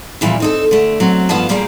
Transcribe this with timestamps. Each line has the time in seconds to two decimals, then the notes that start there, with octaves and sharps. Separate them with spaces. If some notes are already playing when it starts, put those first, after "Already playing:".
0.21 A#2 C#3 E3 F3 G3 A#3
0.40 C4 D#4 A4
0.71 D3 A3
1.00 F#3 C4
1.29 G2 F3 B3 F5 A5
1.49 A#2 G3 A#3 G4 G#4